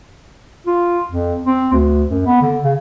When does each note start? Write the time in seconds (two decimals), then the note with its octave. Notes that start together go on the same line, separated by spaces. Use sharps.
0.67 F4
1.11 F2
1.45 C4
1.73 D2
2.10 F#2
2.26 B3
2.42 D3
2.64 C#3